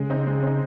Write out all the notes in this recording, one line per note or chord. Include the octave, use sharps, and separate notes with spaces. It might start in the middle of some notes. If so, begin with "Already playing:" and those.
Already playing: C#3 G#3
C4 D#4
G#3
C4 D#4